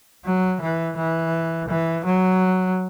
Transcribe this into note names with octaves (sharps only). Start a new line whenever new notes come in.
F#3
E3
E3
E3
F#3